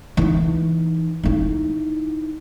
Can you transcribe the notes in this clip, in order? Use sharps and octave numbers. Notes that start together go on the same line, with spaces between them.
E3 D#4
D#4 E4